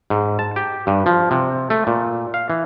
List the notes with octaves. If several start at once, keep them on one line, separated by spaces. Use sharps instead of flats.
G#2
A5
G4
G2
F3
C3
A3
A#2
F5
E3